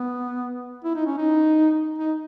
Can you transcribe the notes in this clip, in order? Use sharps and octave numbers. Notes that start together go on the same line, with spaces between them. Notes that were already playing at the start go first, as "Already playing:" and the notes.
Already playing: B3
E4
D#4
C#4
D#4
D#4